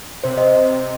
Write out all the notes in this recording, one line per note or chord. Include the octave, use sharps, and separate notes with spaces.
C3 C5
D#5